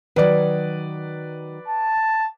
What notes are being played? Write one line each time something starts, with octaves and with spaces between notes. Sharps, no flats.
D#3 F#3 B4 D5
A5